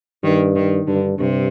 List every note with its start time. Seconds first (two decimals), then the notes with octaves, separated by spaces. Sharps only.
0.23 G2 D#3
0.56 D#3
0.87 G2 D3
1.20 G2 C3